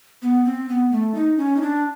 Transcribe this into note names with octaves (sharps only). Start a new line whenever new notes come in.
B3
C4
B3
A3
D#4
C#4
D#4
D4